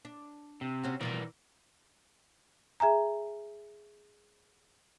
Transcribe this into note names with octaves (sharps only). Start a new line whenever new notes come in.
D4
C3
C4 C#4 F#4
B2 E3 F3 G3 A#4 D5
G#4 E5 G#5 A#5